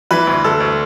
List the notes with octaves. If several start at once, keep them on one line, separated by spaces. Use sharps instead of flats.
E3 B4
D2
D2 A4
D2